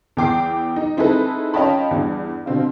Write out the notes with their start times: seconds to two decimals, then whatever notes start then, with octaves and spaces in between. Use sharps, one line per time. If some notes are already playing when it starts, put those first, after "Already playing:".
0.17 E2 B3 G5 D6 C7
0.76 D#4
0.97 C4 D#4 E4 G#4 A4 B4
1.54 C#4 F4 D#5 G5 A5 B5
1.91 E2 G2
2.46 B2 D3 C4 F4